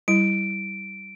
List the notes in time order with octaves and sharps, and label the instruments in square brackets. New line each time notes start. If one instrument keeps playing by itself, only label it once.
[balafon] G3 E4 [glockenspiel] D7